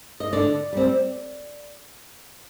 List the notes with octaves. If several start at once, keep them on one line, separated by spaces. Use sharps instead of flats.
D#5
D3 D5
G3 C4